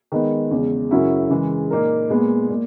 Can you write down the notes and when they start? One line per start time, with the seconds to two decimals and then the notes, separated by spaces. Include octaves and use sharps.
0.12 D#3 G#3 B3
0.51 E2 C#3 G#3
0.91 F#2 C#3 F#3 C#4 E4
1.30 C#3 E3 G#3
1.70 A#2 A#3 D#4 A#4
2.09 A#2 G#3 B3
2.49 A#2